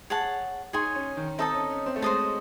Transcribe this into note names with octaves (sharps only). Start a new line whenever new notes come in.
G#4 C#5 F#5 A5
D#4 G#4 C#5 G#5 C6
C#4
D#3
C4 D#4 A4 D#5 A5
C#4
C#4
C4
A3
G#3 C5 D#5 A5